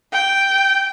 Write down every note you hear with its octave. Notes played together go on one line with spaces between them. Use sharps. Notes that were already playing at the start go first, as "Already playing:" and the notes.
G5